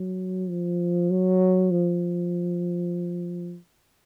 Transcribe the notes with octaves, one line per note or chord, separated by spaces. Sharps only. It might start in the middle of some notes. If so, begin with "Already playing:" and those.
Already playing: F#3
F3
F#3
F3